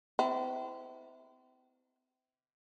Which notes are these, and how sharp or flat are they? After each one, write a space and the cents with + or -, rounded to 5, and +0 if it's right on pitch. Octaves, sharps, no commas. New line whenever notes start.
C4 -35 E4 -20